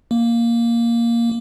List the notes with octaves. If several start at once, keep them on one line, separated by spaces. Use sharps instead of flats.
A#3